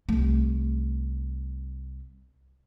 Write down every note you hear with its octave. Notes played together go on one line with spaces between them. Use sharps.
C2 A3